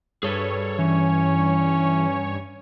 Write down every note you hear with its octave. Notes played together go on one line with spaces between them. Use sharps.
G2 G#4 A4 B4 C#5
E3 C#4